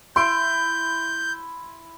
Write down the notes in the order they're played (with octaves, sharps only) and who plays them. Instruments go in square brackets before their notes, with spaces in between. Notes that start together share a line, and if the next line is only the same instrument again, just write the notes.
[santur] E4 [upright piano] C6 D7 [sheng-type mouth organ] G6